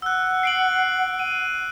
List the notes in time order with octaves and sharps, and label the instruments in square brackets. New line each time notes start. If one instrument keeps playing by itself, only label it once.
[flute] F#5 [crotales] E6 F#6
[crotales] C7 D7 F#7
D#7